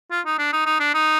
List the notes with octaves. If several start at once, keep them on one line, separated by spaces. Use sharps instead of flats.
F4
D#4
D4
D#4
D#4
D4
D#4